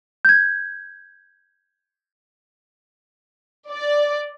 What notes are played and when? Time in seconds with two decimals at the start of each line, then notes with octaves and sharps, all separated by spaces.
0.25 G6 G#6
3.70 D5